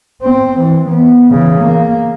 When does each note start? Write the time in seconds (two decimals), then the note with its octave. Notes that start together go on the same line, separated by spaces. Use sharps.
0.23 C4
0.60 E3
0.89 B3
1.31 C#3 E3
1.60 A#3